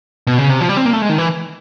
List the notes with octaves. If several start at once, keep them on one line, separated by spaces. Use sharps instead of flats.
B2
C#3
C3
F3
G3
C4
A#3
A3
G#3
D#3
E3